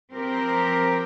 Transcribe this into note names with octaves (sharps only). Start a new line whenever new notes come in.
F3 C4 G4 A#4